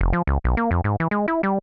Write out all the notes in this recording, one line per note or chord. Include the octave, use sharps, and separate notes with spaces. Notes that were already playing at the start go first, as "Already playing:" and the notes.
F1
F3
C#2
B1
A#3
F2
G#2
E3
G#3
E4
G3